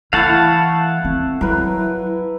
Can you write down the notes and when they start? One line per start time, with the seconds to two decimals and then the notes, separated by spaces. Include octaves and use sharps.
0.13 E3 A3 E4 F5 F#5 A5
1.05 C4
1.41 F#3 E4 A#4 B4